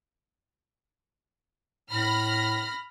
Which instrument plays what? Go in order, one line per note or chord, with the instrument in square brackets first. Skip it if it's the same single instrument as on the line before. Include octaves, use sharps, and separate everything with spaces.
[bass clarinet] A2 [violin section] B5 F6 A#6